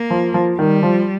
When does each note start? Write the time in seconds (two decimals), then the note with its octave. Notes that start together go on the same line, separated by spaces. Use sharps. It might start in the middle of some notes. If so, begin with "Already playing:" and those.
Already playing: A#3
0.10 F3
0.34 F3
0.59 D#3 G3
0.83 F3